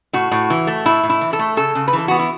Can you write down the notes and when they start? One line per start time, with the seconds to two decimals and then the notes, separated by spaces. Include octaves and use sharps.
0.13 A2 F#4
0.31 A2
0.50 E3
0.67 A3
0.85 A2 E4
1.03 A2
1.09 E4
1.21 E3
1.33 A4
1.39 A3
1.57 C#3 A4
1.75 C#3
1.88 B4
1.93 E3
1.98 A4
2.08 B3 F#4
2.19 E4